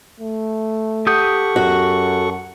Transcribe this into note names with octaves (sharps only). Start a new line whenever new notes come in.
A3
G4 A4 F#5 C#6 D#6 G6
F#2 F#4